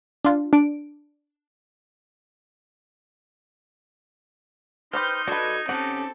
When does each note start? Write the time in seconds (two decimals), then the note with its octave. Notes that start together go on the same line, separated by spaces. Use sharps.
0.25 D4 F4
0.53 D4 D7
4.93 D#4 G4 B4 C5 C6 F6 G6
5.28 D4 F#4 A4 B4 D#5 G#6
5.69 C4 C#4 G4 A4 F#5